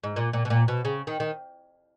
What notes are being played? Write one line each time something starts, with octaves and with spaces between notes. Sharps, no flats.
G#2
A#2
A#2
B2
A#2
B2
C#3
D#3
D#3